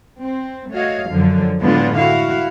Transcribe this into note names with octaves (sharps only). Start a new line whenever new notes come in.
C4
A3 F#4 C#5 D#5 F5
F#2 D3 F3 F#3
A2 D3 G#3 B3 D4 F4
E4 F#4 F5